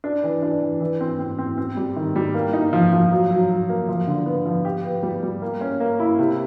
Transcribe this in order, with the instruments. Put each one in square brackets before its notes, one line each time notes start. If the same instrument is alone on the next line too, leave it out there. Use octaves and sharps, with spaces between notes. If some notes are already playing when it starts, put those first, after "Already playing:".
[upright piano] D4
E3
D4
E3
E3
C4
C4
C4
C4
G3
D#3
G3
A#3
D#4
F3
F3
F#3
F#3
F#3
A#3
F3
D3
B3
F3
G4
B3
G3
G3
A#3
C#4
A#3
E4
C3